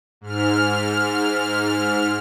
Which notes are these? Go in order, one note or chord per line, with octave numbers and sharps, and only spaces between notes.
G#2 F6